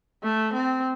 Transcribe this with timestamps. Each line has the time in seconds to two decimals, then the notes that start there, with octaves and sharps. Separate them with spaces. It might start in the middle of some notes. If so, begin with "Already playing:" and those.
0.23 A3
0.53 C4